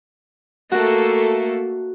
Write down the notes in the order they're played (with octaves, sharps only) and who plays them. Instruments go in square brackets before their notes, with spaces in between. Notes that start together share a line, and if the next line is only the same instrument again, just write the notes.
[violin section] A3 A#3 A4 [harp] F#4